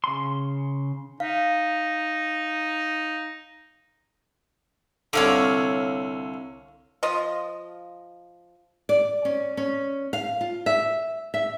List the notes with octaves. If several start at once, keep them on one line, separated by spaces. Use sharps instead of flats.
C#3 C6
D#4 F5
C2 D3 C#5 F5 D6
F3 F4 D#5
D5
C#4
C#4
F5
F4
E5
E5